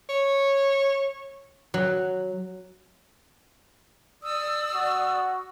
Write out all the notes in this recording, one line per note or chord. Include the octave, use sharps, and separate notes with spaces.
C#5
F#3
D5 D#6 E6
F#4